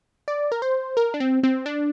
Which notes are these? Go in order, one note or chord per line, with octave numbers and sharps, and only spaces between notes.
D5
A#4
C5
A#4
D4
C4
C4
D4